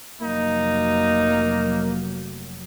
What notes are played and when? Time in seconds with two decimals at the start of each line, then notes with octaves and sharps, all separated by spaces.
0.21 F1 F#3 A#3 D#4